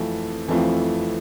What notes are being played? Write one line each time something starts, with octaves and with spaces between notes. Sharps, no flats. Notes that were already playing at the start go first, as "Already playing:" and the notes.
Already playing: F2 E3 A3 C4 F4
F2 E3 A3 C4 F4